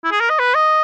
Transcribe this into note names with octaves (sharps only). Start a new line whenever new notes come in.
E4
G#4
A#4
D#5
B4
D#5